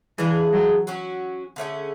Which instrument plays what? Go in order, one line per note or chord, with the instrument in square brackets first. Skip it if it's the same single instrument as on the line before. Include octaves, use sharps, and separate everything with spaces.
[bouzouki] C#3 G#3 D4 G#4 [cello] E3
[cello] F#3
[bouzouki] F#3 C#4 F#4
D3 A3 C#4 G#4